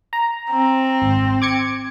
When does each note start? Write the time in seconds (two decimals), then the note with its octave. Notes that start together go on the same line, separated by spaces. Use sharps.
0.13 A#5
0.51 C4
1.02 G#1
1.42 D6 G#6 C#7